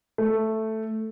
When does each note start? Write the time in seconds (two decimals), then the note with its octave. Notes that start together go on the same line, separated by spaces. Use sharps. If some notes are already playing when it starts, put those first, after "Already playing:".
0.18 A3